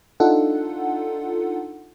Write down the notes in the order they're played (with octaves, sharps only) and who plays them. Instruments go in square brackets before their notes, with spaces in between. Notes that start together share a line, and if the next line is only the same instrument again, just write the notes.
[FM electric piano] D4 D#4 F4 A4 F#5